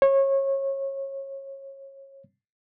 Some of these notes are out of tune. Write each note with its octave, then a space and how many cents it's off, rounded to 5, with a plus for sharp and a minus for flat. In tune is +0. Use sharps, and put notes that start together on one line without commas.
C#5 -25